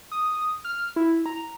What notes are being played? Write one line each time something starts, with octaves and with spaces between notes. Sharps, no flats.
D#6
F6
E4
A#5